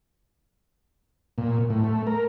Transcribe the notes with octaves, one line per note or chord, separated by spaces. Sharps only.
A#2
A2
A3
A#4